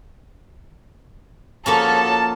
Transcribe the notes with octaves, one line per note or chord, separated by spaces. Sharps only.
F3 A#3 C#4 F#4 A4 C#5 A5